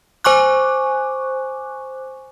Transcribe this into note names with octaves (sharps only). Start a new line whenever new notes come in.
C5 G#5 C#6 D6 F#6